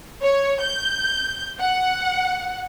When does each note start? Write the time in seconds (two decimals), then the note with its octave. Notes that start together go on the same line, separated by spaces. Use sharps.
0.22 C#5
0.61 G6
1.61 F#5